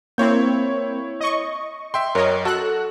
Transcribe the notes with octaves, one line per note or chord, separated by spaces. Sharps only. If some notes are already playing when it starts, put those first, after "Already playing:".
A#3 C4 E4 C#5 G6
D#5 C#6
E5 G5 C6
F#2 A#4 C#5 D#5
F#4 A4 F#6